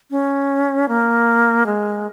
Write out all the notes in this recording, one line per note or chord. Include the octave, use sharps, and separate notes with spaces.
C#4
A#3
G#3